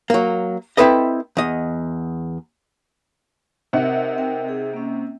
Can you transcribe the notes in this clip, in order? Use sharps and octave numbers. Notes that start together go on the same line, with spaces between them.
F#3 A#3
C4 E4 A4 B4 D#5
E2 D#5
C3 D#4 A#4 E5 F#5
C4 A#4 G5
G#4
A#3 C#4